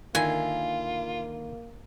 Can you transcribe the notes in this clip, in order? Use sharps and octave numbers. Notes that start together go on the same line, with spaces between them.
D3 D#3 A#3 E4 F4 G#5